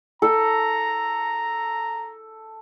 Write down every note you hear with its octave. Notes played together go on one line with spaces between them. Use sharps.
A4 A#5